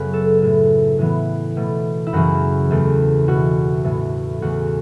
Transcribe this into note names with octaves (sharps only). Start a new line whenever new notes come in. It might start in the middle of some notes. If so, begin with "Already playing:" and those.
Already playing: F#2 C#3 F#3 A3 B3 B4 C#5 A5
A4
A2 A3
A2 E3 B3
B2 A3
E4
F#2 C#3 E3 F#4
E2 E3 A3
B2 A3 F#4
A2 E3 A3
E2 C#3 A3 F#4